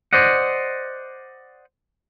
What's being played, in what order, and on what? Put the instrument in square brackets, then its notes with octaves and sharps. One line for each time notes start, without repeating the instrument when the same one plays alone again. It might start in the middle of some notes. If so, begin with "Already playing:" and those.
[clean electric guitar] C5 D5 D#5 F#5